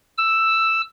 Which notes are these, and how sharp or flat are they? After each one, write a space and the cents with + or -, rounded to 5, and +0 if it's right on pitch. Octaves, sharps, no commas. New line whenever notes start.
E6 +5